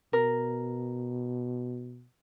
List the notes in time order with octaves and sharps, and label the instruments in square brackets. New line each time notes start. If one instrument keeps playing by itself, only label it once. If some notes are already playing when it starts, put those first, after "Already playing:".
[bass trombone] B2 [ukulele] A#4